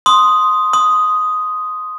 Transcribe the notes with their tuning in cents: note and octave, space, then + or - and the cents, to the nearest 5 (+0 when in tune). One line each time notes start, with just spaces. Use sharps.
C6 +0 D#6 +0
C6 +0 D#6 +0